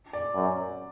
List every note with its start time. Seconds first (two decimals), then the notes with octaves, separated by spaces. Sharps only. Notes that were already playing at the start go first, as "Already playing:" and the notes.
0.13 D5
0.35 F#2